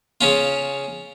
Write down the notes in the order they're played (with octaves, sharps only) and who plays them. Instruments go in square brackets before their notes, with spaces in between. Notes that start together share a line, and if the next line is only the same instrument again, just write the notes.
[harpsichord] C#3 C#4 F4